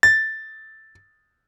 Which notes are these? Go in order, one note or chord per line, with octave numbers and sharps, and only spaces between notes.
A6